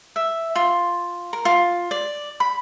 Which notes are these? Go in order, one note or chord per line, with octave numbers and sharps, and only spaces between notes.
E5
F4
A#4
F4
D5
B5